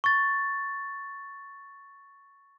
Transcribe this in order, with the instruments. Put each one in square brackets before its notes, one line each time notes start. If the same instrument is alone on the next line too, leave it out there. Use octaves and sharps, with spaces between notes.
[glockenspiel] C#6 A6